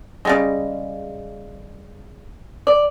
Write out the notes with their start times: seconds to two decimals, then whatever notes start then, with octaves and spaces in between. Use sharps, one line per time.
0.25 C#3 G3 G#3
2.67 D5